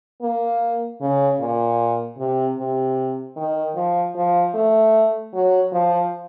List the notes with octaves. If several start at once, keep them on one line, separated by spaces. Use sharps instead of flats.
A#3
C#3
A#2
C3
C3
D#3
F3
F3
A3
F#3
F3